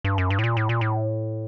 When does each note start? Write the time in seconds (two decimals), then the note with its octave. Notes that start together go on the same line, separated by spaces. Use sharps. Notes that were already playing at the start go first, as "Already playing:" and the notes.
0.04 G2
0.18 F#2
0.30 G2
0.39 A2
0.44 A#2
0.57 A2
0.69 A#2
0.81 A2